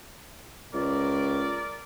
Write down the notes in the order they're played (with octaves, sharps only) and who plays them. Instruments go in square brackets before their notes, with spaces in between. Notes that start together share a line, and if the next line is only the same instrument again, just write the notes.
[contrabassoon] C#2 [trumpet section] A#4 D5